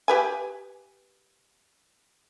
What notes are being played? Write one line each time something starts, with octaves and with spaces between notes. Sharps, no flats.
G4 B4 G#5